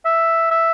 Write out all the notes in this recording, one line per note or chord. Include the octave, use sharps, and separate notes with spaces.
E5
E5